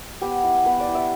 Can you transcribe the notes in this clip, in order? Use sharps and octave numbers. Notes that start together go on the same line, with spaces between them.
B3 G4
E4
B3 B4
D5
E4
E5